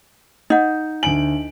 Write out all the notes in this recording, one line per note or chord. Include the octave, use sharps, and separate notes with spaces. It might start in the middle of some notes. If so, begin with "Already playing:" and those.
D#4 D#5 F#5
D2 G#5 D7 F#7